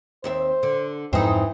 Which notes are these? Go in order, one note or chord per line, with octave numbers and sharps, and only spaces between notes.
D#2 C4 C5 E5
D3
F2 G#2 E3 C4 D#4